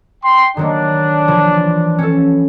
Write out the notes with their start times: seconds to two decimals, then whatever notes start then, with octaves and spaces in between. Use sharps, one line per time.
0.24 G5 C6
0.57 D#3 F#3 A#3 D4
1.28 E3 F3
1.99 C#4 A4